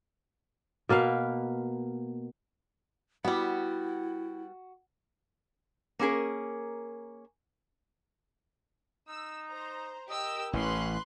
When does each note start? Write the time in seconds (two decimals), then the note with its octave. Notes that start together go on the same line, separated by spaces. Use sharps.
0.89 B2 A#3 B4 F5
3.25 G3 B3 E4 F#4
5.99 A#3 C#4 F#4 G#4 A#4
9.08 D#4 E6
9.48 C5 A#5
10.10 G4 A#4 D#5 E6
10.53 A1 E3 C#4 B4 C6 F#6